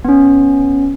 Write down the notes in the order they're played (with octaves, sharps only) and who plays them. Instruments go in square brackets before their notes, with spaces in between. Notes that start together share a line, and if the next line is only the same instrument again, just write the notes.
[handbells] B3 C#4